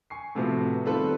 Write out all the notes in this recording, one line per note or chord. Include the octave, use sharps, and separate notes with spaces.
G#5 C#6 C7
A2 C3 F3 B3 F#4
D#3 G3 C4 F4 A4 B4